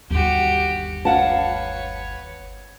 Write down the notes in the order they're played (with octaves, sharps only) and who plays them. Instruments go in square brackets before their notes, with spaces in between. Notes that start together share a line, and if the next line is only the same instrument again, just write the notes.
[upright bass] G1 D#2 [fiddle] F#4 G4
[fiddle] B4 C#5 [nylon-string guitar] F5 F#5 A5